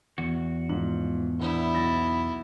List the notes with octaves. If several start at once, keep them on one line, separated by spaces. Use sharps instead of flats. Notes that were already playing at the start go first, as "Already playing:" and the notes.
E2 F#4
G#2 F3 F#7
A2 E3 B3 D4 E4
B1 A6 A#6